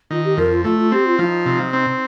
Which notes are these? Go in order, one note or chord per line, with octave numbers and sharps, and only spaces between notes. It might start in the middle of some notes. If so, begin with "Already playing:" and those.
D#3 F4
G4
F2 A#4
F4
A3 F4
F4
C4 G4
F4
F3 D#4 F4
C3
C4